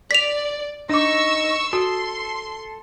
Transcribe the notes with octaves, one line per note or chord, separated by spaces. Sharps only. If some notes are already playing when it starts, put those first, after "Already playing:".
D5 B6 F7
D4 D#4 C#6 D6 E6
F#4 A4 C6